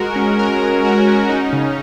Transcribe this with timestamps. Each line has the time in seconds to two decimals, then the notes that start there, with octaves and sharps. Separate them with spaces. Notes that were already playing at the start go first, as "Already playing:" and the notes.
Already playing: G#3 F#4 A#4
0.16 C#4
0.39 A#4
0.62 G#3
0.85 F#4
1.07 C#4
1.29 D#4
1.53 C#3